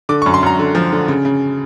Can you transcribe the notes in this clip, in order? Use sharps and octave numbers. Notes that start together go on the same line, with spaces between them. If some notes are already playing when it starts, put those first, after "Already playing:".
D3 D6
C#6
F#2
C6
F#2 A#5
D3
F3
D3
C#3
C#3